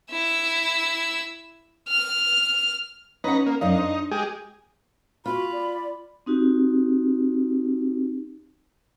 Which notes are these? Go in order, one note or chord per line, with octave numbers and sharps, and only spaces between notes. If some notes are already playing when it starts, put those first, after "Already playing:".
E4 E6
F6
C#4 D#4 B4 F#5 A#5
A#3
F#2 D#4 D5 F5
D4 C5
G#3 G4 G#4
F4 F#4 B5
D5
C4 D#4 F#4 G4